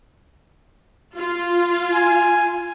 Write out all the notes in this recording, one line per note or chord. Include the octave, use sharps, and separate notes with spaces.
F4
G#5